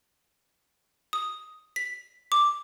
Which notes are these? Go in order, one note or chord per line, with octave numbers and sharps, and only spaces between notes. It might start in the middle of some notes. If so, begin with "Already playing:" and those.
D#6
B6
D6